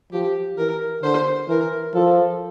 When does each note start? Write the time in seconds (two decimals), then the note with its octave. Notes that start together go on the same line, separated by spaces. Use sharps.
0.12 F3 G4
0.57 E3 A#4
1.03 D3 C5
1.49 E3 A#4
1.94 F3 A4